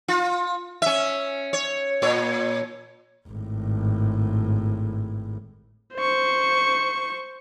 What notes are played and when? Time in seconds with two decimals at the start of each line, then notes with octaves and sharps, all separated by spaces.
0.08 F4
0.82 C#4 E5
1.53 C#5
2.02 A#2 C#5
3.29 G#1 A2
5.95 C5 C#6